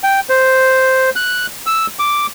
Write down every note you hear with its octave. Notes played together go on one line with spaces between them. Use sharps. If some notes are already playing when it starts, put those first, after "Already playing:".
G5
C5
F#6
E6
D6